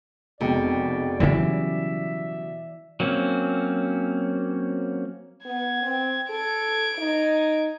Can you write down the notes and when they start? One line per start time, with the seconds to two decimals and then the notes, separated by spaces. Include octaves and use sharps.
0.41 F1 B2 G#3 D5 G5
1.20 C#3 E3 F#3 G3 G4 D5 E5
3.00 F#3 A#3 C4 C#4
5.46 B3 G#6
5.82 C4
6.30 A4 G#6 D7
6.98 D#4